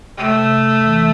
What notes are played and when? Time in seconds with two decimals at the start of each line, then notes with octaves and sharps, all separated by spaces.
0.17 C3 A3
0.39 C3
0.62 E2
0.84 E3